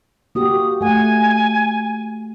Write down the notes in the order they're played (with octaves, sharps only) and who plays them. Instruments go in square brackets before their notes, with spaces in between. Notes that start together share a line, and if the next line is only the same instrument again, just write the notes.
[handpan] A#3 F#4 G4 [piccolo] D#6
[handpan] A3 F#5 [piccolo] G#5